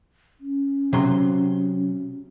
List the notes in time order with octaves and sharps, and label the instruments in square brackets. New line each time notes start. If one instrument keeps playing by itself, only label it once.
[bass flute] C#4
[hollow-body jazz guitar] C3 F#3 C6